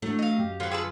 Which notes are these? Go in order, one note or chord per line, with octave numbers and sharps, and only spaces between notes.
E3 F#3 A3 D4
D#5 F5
F#2 G4
D3 F#3 F4 B4
F4 G#4 A4 B4